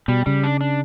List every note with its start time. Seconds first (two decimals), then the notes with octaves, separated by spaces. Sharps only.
0.08 B2 G3
0.26 C#3 G3
0.44 D4
0.61 D4